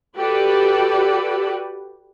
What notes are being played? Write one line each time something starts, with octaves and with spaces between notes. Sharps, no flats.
F#4 G4 A4 B4 D5